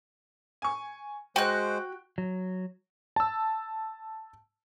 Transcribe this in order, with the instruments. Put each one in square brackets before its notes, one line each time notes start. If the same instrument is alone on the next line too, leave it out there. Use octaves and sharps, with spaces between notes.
[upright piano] G#5 C#6
[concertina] G#3 C5 [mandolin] F#4 F#6 [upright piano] G5
[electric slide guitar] F#3
[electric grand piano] A5 E6